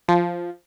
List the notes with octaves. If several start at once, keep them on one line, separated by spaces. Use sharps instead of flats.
F3